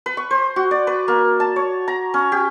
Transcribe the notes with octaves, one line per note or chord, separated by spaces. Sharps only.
B4
C#6
C5
F#4
D5
B4
A#3
A5
C#5
A#5
C#4
G4